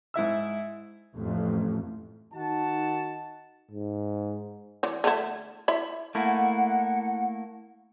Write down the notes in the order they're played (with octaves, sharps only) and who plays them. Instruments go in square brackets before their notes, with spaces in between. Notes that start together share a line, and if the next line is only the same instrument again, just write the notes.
[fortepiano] G#2 E4 E5 E6
[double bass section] A1 F2 A2
[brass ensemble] D#3 D#4 F#4 F#5 A5
[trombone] G#2
[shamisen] E3 D5
D3 A3 E4
E4 E5 B5
[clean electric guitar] A3 A#3 E4 [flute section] F#5